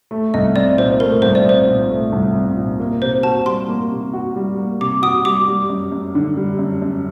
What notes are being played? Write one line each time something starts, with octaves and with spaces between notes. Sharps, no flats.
A3
C2 D#5
C4 D5
A#2 C5
A3 A#4
C2 C5
D5
C4 C5
A#2
A3
C2
C4
A#2
A#3
C3 C5
F#4 A5
G3 C6
A#3
C3
F#4
G3
A#3
C3 D6
F#4 D#6
G3 D6
G3
F#2
F#2
D3
G3
F#2
F#2